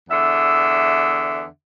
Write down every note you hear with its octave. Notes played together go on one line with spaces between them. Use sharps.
E2 D3 E5